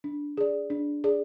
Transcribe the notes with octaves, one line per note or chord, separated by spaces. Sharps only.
D4
G#4 D5
D4
G#4 D5